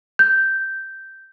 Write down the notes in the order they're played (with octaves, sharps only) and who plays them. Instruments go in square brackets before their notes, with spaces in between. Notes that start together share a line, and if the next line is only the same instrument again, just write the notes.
[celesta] G6